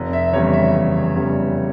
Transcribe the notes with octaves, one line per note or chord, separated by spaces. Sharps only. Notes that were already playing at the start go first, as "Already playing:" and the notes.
Already playing: F1
E5
E2 C#3 G3 C#5
E5
F1
E2 C#3 G3